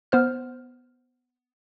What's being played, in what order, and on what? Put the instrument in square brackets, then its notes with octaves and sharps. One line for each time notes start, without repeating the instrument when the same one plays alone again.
[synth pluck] B3 C5 F6